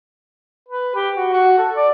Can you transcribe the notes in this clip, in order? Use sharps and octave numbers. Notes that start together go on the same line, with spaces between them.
B4
G4
F#4
F#4
A4
D5